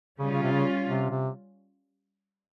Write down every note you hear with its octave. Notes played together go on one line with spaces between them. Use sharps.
C#3 G3 C#4 F4
C#3
C3
C#3
C3
C3